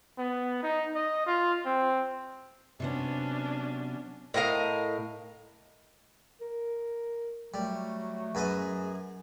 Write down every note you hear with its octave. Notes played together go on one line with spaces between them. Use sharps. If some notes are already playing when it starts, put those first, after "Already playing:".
B3
D#4
D#5
F4
C4
C3 F#3 B3 C#4 D4
A2 A#4 D#5 F5
A#4
F#3 G3 A3
F#2 G#4 B4 D#5